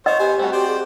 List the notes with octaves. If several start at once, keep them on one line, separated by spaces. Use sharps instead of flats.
C5 C#5 D#5
B3 G4 C5 G#5
G3 A3 C4 F#4
G4 C5 D5 G5
G#4